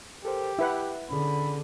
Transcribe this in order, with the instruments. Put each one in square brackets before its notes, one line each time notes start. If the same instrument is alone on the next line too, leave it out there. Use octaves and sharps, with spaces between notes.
[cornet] G4 [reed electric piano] A4 A#4 C5
[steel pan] E4 B4 F#5 [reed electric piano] E5
[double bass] D3 [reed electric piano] C#4 G#4 [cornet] B5